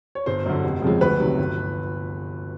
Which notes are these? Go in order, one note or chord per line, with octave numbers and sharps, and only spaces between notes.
C#5
G1 C5
F#2 D3
F1
F2 C#3 F3 G#3
D2 B4
C3 D#3 F#3
G1